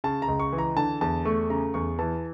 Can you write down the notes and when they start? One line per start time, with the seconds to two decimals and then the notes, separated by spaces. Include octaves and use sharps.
0.04 C#3 A5
0.22 A#5
0.28 C#2
0.40 C#6
0.53 E3
0.58 A#5
0.76 D3 A5
1.01 E2 A5
1.25 A3 C#6
1.50 C#3 A#5
1.74 E2 C#6
1.99 E3 A5